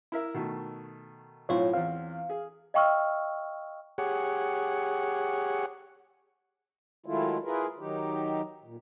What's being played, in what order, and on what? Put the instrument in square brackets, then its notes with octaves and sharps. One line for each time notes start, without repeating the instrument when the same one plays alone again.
[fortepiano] E4 A#4 E5
B2 D#3 A3
[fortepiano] B1 A2 C4 [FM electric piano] F4 C#5
[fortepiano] E2 C4 [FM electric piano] F5
[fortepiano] G#4
[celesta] D#5 F5 G5 C#6 E6 F6
[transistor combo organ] G4 G#4 C#5 F#5
[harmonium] D#3 F#3 G#3 A3 E4 F4
E4 F4 G#4 A#4 B4
D#3 F#3 D#4 G4
A#2